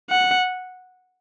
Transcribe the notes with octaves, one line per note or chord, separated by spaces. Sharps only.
F#5